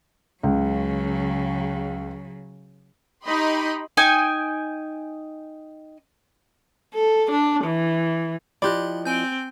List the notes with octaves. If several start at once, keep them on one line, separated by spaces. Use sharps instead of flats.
C#2 C#3 F#3
D#4 G4 D#5 B5 C6
D#4 G5 G#5
A4
D4
E3
F3 E4 G4 D5 D#5 B5 C6 F#6
C4 G5 G#5 G6